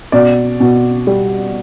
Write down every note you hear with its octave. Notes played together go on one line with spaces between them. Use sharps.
B2 D5
B2
G3